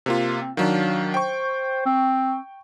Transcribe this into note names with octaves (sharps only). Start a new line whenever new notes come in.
C3 A#3 F4
C4
D#3 F#3 D4 F5
C5 G5 C#6
C4